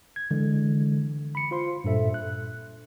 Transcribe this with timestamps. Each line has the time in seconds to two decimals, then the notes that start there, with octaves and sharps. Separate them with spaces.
0.16 G#6
0.31 D3 E3 G#3
1.35 B5 C#7
1.51 F4 C5 C6
1.84 G2 A#2 A4 E5
2.14 F#6